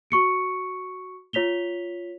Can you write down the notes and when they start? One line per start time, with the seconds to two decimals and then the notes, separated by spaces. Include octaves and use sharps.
0.11 F#4 C#6 C#7 D7
1.33 F4 C#5 B6 F7 G7